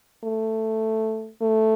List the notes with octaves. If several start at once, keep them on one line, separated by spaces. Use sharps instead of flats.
A3
A3